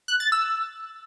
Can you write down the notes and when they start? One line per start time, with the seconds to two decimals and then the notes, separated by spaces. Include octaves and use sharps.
0.08 F#6
0.20 A6
0.32 E6